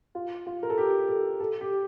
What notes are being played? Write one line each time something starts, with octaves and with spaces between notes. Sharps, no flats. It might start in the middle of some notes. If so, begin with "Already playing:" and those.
F4
F4
A#4
A4
G4
A4
A4
G4